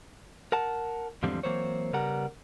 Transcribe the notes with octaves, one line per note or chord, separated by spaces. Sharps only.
A#4 F#5 A5
E2 G#2 D3 F3 G3 C4
E3 F#3 A#3 C4 C5 C#5
C#3 G3 B3 A#4 F#5 A#5